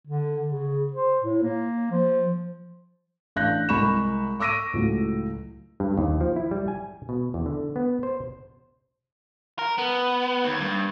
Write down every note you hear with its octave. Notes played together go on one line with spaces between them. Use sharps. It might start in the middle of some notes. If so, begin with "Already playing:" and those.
D3
C#3
C5
A2
A#3
F3
A1 D4 F5 F#6 G6 A#6
C2 G#3 B5 C#6 E7
C#6 D6 E6 A#6 D7 D#7
C#2 A2 F#3
G2
D#2
F3
E4
G3
G#5
B2
E2
D3
B3
C5
A#4
B3
D#2
G2